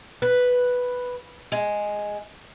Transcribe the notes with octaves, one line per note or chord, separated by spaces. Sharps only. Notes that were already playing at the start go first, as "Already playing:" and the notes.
B4
G#3